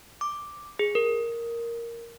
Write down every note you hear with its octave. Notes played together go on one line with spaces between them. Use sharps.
D6
G#4
A#4